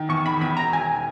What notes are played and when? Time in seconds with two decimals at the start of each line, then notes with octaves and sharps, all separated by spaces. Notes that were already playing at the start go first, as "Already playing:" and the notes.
Already playing: D#3
0.09 E2 C#6
0.25 D#3 B5
0.41 E2 B5
0.57 E1 A#5
0.73 E1 G#5